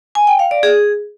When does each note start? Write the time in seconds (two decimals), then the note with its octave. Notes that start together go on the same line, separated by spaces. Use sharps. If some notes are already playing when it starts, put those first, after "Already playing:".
0.15 G#5
0.27 G5
0.39 F5
0.51 D5
0.63 G#4